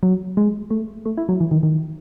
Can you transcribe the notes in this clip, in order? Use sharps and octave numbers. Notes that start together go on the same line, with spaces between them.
F#3
G#3
A3
A3
E4
F#3
E3
D#3
D#3